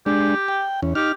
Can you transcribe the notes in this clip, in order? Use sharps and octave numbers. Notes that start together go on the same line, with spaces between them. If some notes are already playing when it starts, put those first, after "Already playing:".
G#3 D4 G4
G5
E2 C#4
D#4 G4 F6